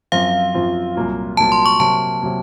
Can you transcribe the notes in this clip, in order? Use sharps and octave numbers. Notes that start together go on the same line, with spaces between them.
F#2 F3 C4 F4 F5
F#2 F3 C4 F4
C2 A#2 F#3 A#3 F4
C2 A#2 F#3 A#3 F4 A5
C6
C#6
C3 F#3 A#3 A5
C3 F#3 A#3